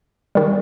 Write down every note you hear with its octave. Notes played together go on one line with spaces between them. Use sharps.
D#3 G3